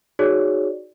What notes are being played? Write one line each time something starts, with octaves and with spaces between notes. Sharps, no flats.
D#4 F#4 G#4 C#5 D5